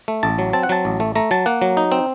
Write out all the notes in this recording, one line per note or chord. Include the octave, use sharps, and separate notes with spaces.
A3
A1 A5
F#3
C4 A5
F#5
F#3 A5
A1
A3
A3 A#5
F#3 A5
A#3 F#5
F#3
D#4
C4